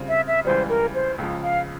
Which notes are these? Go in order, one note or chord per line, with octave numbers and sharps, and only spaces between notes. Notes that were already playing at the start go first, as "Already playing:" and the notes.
Already playing: C#3 G3 C4 F4
E5
E5
C#2 C#3 E3 G3 C5
A#4
C5
C#2 C#3 F3
F5